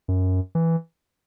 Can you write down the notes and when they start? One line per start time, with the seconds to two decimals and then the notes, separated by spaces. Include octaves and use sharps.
0.08 F#2
0.55 E3